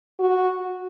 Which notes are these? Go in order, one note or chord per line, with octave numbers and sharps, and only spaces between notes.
F#4